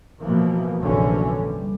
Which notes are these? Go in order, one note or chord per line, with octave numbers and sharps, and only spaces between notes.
B2 E3 F3 A#3
F1 A#1 D3 E3 F#3 C#4
G3